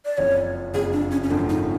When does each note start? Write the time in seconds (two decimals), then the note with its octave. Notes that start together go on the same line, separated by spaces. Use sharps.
0.05 D5
0.18 F#1 F2 C#3 F3 C#5
0.74 F#1 F2 C#3 F3 G#4
0.93 D4
1.11 C#4
1.24 C#4
1.30 G#1 F#2 C#3 F3 A3 D4
1.49 D#4